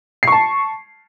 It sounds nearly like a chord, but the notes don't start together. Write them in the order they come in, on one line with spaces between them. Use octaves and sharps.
C7 C#6 A5